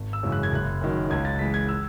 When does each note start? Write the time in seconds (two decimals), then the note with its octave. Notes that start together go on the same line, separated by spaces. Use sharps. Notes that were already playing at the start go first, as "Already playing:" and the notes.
Already playing: G#1
0.13 E6
0.23 F#2 C#3 E3 G#3
0.32 F#6
0.43 G#6
0.52 F#1 F#6
0.82 F#2 D#3 F#3
1.10 C#2 G#6
1.25 A6
1.39 C#3 E3 G#3 B6
1.54 G#6
1.69 E6